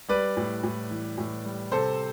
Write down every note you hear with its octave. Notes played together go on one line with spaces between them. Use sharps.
G3 B4 D5
A2
A2
E3
A2
G3
C3 A4 C5